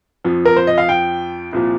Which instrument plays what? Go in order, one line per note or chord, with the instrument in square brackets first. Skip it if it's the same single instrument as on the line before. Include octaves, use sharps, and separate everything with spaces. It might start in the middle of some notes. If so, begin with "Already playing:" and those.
[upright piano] F2 F3
A#4
C5
D#5
F5
G5
C2 A#2 F3